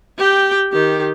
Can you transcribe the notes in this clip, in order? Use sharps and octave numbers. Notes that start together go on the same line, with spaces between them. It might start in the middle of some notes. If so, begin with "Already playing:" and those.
G4 G5
D#3 G4